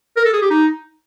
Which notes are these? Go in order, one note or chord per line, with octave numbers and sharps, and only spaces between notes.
A#4
A4
G#4
G4
D#4